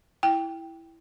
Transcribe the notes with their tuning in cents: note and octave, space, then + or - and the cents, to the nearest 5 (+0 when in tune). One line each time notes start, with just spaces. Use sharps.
E4 +0 G5 +0